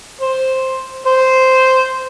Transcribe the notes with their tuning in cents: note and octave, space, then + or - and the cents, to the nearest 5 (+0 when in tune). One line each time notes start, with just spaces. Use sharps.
C5 +5
C5 -5